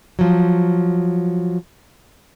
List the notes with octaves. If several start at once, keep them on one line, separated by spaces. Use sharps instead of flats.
F3 F#3